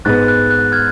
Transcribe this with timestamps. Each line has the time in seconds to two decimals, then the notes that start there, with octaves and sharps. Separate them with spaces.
0.05 G#2 G#3 B3 F#6 A6
0.28 F#6
0.50 F#6
0.72 F6 G#6